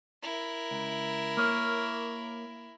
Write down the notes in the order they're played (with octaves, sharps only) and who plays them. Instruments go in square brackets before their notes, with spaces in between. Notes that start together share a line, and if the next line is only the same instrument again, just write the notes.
[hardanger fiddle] E4 A#4
[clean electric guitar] C#2
A#3 C#5